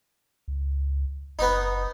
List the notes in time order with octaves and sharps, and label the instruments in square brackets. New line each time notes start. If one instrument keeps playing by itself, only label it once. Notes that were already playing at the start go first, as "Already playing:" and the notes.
[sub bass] C#2
[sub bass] F#1 [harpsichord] B3 D#4